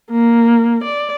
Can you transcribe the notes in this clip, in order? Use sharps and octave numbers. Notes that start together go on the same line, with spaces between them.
A#3
D5